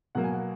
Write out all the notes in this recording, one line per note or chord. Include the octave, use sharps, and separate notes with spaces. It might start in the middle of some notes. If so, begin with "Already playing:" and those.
B2 F#3 A#3 F#5
G#5
F#5